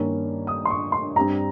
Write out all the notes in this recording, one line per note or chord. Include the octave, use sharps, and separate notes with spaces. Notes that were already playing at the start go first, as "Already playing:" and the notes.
Already playing: G2 D#3 A#3 C#4
D#6
C6
C#6
C6
G2 G3 C4 A#5